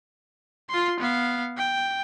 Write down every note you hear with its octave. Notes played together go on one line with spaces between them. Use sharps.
F4 C6
B3 F5
G5